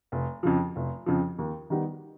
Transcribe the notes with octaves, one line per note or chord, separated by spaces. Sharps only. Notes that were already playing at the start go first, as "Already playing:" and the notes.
F1
F2 C#3 F3
F1
F2 C#3 F3
D#2
D#3 G3 B3 D#4